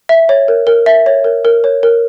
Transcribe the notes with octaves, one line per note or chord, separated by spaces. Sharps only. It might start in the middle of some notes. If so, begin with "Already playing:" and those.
E5
C#5
A#4
A#4
E5
C#5
A#4
A#4
C#5
A#4